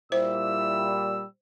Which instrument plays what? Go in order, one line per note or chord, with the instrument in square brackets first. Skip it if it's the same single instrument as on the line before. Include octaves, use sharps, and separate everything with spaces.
[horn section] A#2 G3 [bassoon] E4 [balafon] C5 [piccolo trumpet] E6